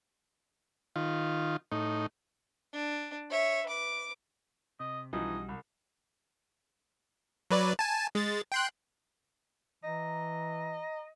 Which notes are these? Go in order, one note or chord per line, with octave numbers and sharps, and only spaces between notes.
D#3 F4
A2 D#4
D4
C#5 E5
B4 D6
C3 D#5
B1 E3 F3 G3 C#4 D#4 F#4 D#5
C2
F#3 B4 D5
G#5 A5
G#3 A6
G5 C6 F#6
E3 D#5 A#5